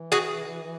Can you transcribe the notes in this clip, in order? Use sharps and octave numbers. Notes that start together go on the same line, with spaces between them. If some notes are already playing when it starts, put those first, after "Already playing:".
Already playing: E3
F#4 G#4